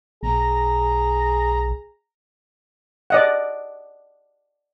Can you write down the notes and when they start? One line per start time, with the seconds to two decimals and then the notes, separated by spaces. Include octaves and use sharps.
0.23 B1 G#4 A#5
3.10 D5 D#5 F#5